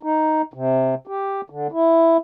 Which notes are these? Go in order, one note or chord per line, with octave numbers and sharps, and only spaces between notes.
D#4
C3
G4
D3
E4